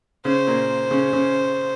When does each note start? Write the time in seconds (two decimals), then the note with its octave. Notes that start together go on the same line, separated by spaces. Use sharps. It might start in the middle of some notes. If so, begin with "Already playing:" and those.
0.25 C#3 C#4 C5
0.47 A#2 A#3
0.91 C#3 C#4
1.13 C#3 C#4